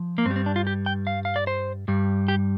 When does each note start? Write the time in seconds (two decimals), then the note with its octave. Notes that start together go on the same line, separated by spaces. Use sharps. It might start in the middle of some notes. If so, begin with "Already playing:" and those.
Already playing: F3
0.18 A#3
0.26 G2 C4
0.31 G3
0.36 C4
0.46 D4
0.56 F4
0.67 G4
0.86 G5
1.07 F5
1.25 F5
1.36 D5
1.47 C5
1.88 G2 G3
2.28 G4